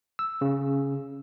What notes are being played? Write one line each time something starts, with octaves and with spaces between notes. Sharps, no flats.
E6
C#3